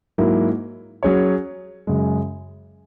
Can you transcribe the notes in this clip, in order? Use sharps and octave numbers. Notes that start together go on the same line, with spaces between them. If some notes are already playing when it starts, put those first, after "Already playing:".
G#2 F#3 A#3 E4
F#3 C#4 G#4 C#5
F#2 C#3 G#3